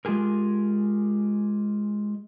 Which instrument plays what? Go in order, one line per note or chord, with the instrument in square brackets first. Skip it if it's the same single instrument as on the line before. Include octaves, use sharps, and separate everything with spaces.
[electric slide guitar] G#3 F4 G4 G#4 A#4